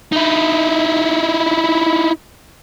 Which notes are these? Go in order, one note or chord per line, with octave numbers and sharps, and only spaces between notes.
D#4 E4